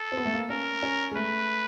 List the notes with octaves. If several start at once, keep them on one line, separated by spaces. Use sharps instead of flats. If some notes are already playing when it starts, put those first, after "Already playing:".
Already playing: A4
C4
B3
A3
A#3
C#4 A#4
C#4
G#3
A3 B4